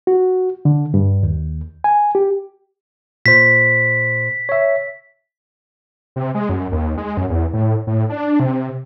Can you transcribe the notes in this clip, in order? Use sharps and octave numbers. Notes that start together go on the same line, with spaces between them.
F#4
D3
G2
D#2
G#5
G4
A#2 C5 B6
C#5 E5
C3
G#3
F#2
D#2
G#3
F#2
E2
A2
A2
D4
C3